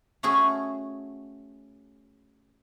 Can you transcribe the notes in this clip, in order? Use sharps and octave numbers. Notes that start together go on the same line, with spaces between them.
A3 C#4 F#4 G#4